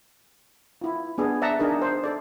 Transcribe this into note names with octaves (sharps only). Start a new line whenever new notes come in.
E4 F4
B3 D4 G#4
D5 E5 F#5 A5 A#5
D4 D#4 G#4 A#4
C5
A4 D5